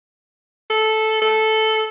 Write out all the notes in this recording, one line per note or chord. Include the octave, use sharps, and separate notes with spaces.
A4
A4